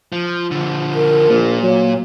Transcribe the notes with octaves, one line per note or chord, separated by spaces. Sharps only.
F3
D3 F3
A#4
A#1 A#2
F#3 C#5